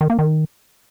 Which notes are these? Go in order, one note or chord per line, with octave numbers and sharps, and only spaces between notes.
D#3
A#3
D#3